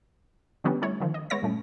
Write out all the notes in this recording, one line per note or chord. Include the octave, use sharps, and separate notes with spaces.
D3 F3 G3 B3 C#4 D4
G3 A3 E4 C#5
D3 D#3 F3
D#5
G#3 B3 C#5 E5 A#6
G2 A#2 A3 C#4